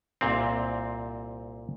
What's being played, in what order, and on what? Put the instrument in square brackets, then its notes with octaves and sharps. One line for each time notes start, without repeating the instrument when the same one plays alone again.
[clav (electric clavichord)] C2 A#2 C4